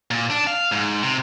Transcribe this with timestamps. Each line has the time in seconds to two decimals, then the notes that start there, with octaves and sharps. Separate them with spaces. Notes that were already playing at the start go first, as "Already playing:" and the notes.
0.11 A#2
0.30 D4
0.47 F5
0.72 G#2
1.03 C3